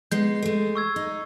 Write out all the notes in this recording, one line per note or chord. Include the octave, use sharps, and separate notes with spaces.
G#3 B3 D#4 G6 C7
G#3 A3
C#6 E6 G#6
D#4